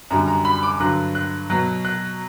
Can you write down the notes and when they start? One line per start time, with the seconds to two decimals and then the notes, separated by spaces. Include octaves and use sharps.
0.10 F#2 D3 G3 A#5
0.28 A#5
0.45 B5
0.63 D6
0.80 G2 D3 F#3 F#6
1.15 F#6
1.50 B2 F#3 F#6
1.85 F#6